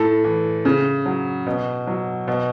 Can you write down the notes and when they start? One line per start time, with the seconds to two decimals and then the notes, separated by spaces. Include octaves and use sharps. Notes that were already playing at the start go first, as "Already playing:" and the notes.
Already playing: A2 A4
0.24 E3
0.65 C#3
1.06 F#3
1.47 B2
1.87 F#3
2.28 B2